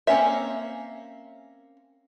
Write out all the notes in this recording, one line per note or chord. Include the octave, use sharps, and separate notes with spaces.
A#3 C4 C#4 C#5 E5